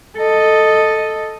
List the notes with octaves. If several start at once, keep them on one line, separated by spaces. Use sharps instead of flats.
A4 D#5